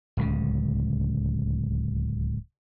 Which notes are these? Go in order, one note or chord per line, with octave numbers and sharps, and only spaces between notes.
D1 C#2 C#3